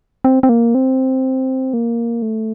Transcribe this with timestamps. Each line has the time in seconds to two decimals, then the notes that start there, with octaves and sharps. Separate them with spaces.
0.24 C4
0.43 C4
0.49 A#3
0.75 C4
1.74 A#3
2.22 A3